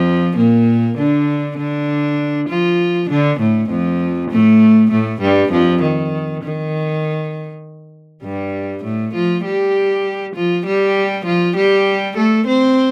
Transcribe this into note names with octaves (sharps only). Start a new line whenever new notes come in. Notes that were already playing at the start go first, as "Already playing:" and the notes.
Already playing: F2 F3
A#2 A#3
D3 D4
D3 D4
F3 F4
D3 D4
A2 A3
F2 F3
A2 A3
A2 A3
G2 G3
F2 F3
D#3
D#3
G2 G3
A2 A3
F3 F4
G3 G4
F3 F4
G3 G4
F3 F4
G3 G4
A3 A4
C4 C5